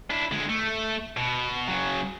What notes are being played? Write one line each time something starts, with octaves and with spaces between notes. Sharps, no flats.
D4 E4
D3 G#3
A3
B2
C#3 F#3